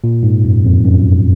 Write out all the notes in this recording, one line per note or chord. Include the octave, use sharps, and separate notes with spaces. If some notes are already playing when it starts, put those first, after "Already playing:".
A#2
G#2
F#2
F2
F#2